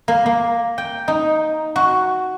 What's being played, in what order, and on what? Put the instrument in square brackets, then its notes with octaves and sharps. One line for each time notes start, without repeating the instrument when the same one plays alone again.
[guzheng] A#3
A#3
G5
D#4
F#4